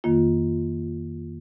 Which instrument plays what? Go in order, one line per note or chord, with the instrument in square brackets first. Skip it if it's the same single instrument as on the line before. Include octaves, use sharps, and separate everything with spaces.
[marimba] F2 D#3 A#3 F4